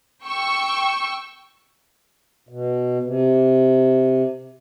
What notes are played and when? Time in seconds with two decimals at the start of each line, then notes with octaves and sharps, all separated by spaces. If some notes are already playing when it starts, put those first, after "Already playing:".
0.24 G5 C#6 E6
2.49 B2
3.03 C3